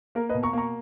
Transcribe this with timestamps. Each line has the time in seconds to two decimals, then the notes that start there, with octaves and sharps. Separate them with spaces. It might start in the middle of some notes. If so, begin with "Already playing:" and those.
0.15 A#3 A#4
0.29 B4 D#5
0.34 B2
0.43 A#5 C#6
0.53 A#3 A#5 C#6